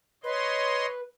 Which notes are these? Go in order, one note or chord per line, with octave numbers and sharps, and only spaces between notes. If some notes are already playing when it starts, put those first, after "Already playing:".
B4 C#5 D#5 C6